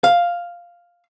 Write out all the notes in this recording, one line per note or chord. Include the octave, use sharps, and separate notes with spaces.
F5